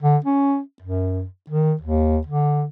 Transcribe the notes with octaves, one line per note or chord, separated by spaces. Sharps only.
D3
C#4
F#2
D#3
D#2
D3